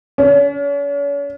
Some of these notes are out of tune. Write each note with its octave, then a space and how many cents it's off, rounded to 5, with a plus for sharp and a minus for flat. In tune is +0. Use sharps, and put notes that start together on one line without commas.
C#4 +40